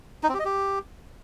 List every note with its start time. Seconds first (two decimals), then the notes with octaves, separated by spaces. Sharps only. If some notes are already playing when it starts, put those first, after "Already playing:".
0.23 D#4
0.29 C4
0.34 G4
0.40 D#5
0.45 G4